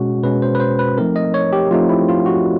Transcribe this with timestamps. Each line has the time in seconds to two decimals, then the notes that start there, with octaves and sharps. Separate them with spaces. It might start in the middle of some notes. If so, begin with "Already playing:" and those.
Already playing: B2 G#3 C#4 F#4
0.23 B2 G#3 C#4 B4
0.42 C5
0.55 B4
0.60 C5
0.79 B4
0.97 F3 A3 C4 D#4 A#4
1.16 D#5
1.34 C#5
1.53 G4
1.71 F3 A3 C4 D#4 F4
1.89 E4
2.09 F4
2.26 F#4